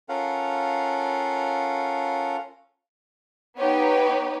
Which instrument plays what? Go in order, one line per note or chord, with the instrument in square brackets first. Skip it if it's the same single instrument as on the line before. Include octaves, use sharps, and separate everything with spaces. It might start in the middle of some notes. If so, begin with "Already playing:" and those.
[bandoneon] C#4 F4 A4 A#4 F5 F#5
[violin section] B3 D#4 G4 B4 C#5 B5